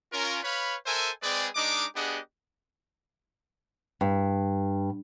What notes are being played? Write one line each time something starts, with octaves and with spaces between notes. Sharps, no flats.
C#4 F4 A#4
B4 C#5 F5 B5
A4 A#4 C5 E5 G#5
G#3 C4 G#4 B4 D5
G#3 D4 D#4 D#5 D6
B3 D4 G4 G#4 D#5 F#5
G2